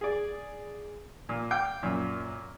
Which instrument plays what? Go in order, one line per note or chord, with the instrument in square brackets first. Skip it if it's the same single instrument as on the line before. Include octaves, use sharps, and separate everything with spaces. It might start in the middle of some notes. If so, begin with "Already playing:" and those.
[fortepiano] G#4 D5
A#2
F5 G5 D6
F#2 A#2